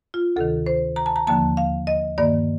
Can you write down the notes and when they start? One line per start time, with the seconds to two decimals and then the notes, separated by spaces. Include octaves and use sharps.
0.14 F4
0.36 D2 C3 D#3 A4
0.66 C5
0.96 A#5
1.06 A5
1.16 A#5
1.27 D#2 D3 F3 A#3 A5
1.57 F5
1.87 D#5
2.18 G2 D#3 A#3 D5